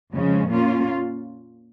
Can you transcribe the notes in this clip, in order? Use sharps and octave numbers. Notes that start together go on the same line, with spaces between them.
F2 C#3 F3 G#3 C#4
A#2 A#3 C#4 F4